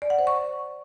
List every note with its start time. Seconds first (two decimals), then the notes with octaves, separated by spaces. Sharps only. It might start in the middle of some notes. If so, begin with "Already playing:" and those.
0.02 D5
0.10 F#5
0.19 C5
0.27 C#6